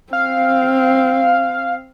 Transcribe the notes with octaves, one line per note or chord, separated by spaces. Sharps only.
C4 F5